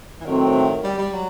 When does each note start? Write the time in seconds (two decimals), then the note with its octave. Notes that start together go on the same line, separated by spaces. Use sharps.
0.21 E3
0.25 A2 D#3 F#3 A3 C4
0.84 G3
0.98 G3
1.13 F#3